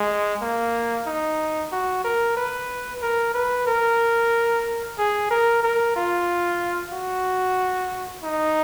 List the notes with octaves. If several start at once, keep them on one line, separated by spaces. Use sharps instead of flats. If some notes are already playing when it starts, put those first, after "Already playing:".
Already playing: G#3
A#3
D#4
F#4
A#4
B4
A#4
B4
A#4
G#4
A#4
A#4
F4
F#4
D#4